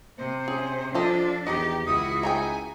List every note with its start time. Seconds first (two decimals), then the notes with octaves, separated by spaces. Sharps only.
0.18 C3 C5
0.48 C#4 G#4
0.95 F3 D4 F4 A4 D#5
1.47 E2 D#3 G4 D#5 D6
1.87 C#2 E4 F#4 D#6
2.23 D#4 G#4 G5 G#5